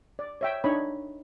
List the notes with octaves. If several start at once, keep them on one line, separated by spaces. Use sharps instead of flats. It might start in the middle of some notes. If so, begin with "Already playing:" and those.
D5
C#5 E5 G5
D4 D#4 C#5 B5